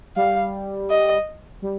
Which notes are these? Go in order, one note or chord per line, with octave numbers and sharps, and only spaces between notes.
G3 F5
D#5
G3